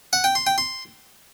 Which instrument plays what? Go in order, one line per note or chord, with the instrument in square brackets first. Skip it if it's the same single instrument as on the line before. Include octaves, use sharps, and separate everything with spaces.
[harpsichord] F#5
G5
C6
G5
C6